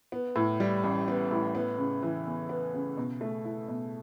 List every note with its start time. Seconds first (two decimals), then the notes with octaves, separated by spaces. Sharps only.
0.12 B3
0.36 A2
0.60 G3
0.84 A1
1.08 B3
1.31 A2
1.55 B3
1.78 C#3
2.03 E3
2.26 E2
2.49 B3
2.74 C#3
2.97 B2
3.21 A3
3.45 E4
3.68 B2